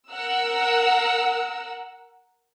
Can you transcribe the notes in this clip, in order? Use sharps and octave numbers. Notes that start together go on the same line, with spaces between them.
A#4 F#5 E6